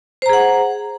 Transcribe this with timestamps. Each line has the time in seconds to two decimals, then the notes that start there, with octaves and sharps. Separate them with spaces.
0.22 C5
0.26 A#5
0.29 G#4
0.33 F#5